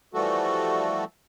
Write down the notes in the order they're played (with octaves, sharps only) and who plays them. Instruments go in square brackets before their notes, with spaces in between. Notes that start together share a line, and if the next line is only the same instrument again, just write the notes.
[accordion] E3 F3 G3 A3 F#4 A4